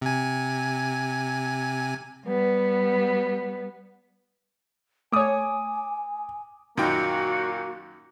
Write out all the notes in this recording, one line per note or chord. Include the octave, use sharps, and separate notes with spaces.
C3 G#5
G3 B3
A3 C#5 G#5 D6 D#6
F#2 A#2 D#3 A#3 F#4 G5